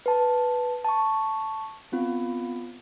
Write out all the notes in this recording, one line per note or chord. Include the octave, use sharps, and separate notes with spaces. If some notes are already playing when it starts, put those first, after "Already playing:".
B4 A5
A5 C#6
B3 C4 F4